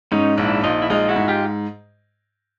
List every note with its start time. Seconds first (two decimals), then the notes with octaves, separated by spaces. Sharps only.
0.12 G#2 C#4 D#4
0.38 A#1 D4 E4
0.64 A#1 D#4 F4
0.82 E4
0.90 G#3 D#4 F4
1.09 E4 F#4
1.16 G#2
1.28 F4 G4